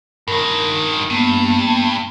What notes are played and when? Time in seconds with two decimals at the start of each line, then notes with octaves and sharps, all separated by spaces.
0.28 G2 D#3 A#4
1.10 G2 A#3 B3